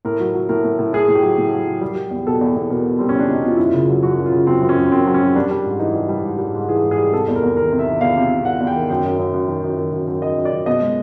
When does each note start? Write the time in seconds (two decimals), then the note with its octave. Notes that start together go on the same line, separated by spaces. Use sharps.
0.05 A2 A#4
0.20 F#3
0.34 F#3
0.49 A2 A#4
0.65 A2
0.79 A2
0.93 A2 G#4
1.09 A2
1.15 G4
1.22 F#3
1.38 A2
1.53 F#3
1.67 F#3
1.81 G3
1.96 G3
2.11 E2
2.27 B2 A4
2.41 E2
2.56 E2
2.70 B2 A#4
2.86 B2
2.99 G3 C4
3.09 C#4
3.15 E2 D4
3.29 B2 D#4
3.44 B2 F4
3.57 F#2 E4
3.68 F4
3.74 C#3
3.89 F#3
4.03 F#2 F#4
4.19 F#3
4.26 F4
4.32 C#3
4.47 F#3 C4
4.62 F#2
4.69 C#4
4.77 F#2
4.91 F#2 C4
5.07 F#3
5.14 C#4
5.22 F#2
5.36 G3 D4
5.51 G3
5.65 G#2
5.80 E3 D#4
5.95 G3
6.09 G3
6.24 G#2
6.39 G3
6.54 G#2
6.69 E3 G#4
6.84 G#2
6.91 G#4
6.98 G3
7.13 C3 A4
7.28 E2
7.36 A#4
7.43 E2
7.57 D#3 A#4
7.72 C3
7.79 E5
7.87 D#3
8.01 E2 F5
8.16 C3
8.31 C3
8.45 E2 F#5
8.60 E2
8.67 G5
8.76 D#3
8.90 F#2 G5
9.05 F#2
9.19 F#2
9.34 F#2
9.48 D#3
9.63 F#2
9.78 D#3
9.93 F#2
10.07 F#2
10.22 F#2 D#5
10.38 F#2
10.45 D5
10.52 F#2
10.66 B2 D#5
10.81 G#3